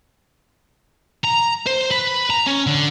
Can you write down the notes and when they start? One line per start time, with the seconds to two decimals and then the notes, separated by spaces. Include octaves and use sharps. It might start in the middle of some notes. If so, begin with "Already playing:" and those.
1.24 A#5
1.66 C5
1.91 B4
2.30 A#5
2.47 C#4
2.67 D3